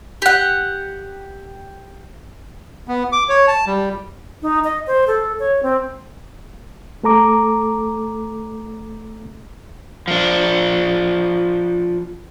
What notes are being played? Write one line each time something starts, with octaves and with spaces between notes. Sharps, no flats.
G4 F#5
B3
D6
C#5
A5
G3
D#4
D#5
C5
A4
C#5
C4
A3 A4 A#5 D6
F3 D4